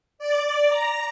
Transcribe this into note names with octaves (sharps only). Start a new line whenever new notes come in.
D5
A#5